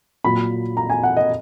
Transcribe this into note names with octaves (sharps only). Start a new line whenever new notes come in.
A#2 F#3 B5
A#5
G#5
F#5
D#5